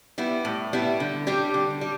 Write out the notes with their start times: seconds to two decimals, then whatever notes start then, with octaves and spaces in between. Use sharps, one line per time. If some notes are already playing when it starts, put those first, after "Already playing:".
0.18 G3 B3 E4
0.45 A2
0.73 G3 B3 E4
1.00 D3
1.27 G3 D4 G4
1.54 D3
1.81 G3